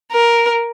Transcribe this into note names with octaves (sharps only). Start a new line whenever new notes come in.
A#4